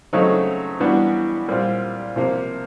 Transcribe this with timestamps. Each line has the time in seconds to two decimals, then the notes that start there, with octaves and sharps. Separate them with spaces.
0.13 C#3 F#3 A3 C4 D#4
0.80 E3 G3 B3 D4 F#4
1.48 A#2 G3 C4 F4
2.16 C3 F3 A#3